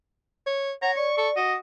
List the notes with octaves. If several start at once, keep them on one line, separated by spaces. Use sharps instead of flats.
C#5
C#5 F#5 A#5
D5 C#6
A4 C#6
F#4 D#5